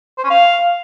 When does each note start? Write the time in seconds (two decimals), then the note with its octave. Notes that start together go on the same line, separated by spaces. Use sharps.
0.18 C5
0.24 C#4
0.30 F5